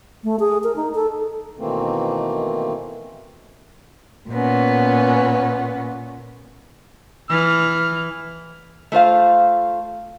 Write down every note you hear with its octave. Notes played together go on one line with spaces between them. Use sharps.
A3
G#4
A#4
D#4
A4
B2 D#3 E3 A3 A#3 C4
A#2 B3 C#4
E3 F6
A3 F4 C5 F5